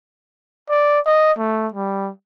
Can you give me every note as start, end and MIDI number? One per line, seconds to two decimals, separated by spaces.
0.70 1.00 74
1.06 1.32 75
1.38 1.67 57
1.74 2.11 55